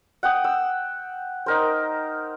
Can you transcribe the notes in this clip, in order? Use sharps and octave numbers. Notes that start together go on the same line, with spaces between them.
F#5 G5 D#6
E6
D#4 A#4 C5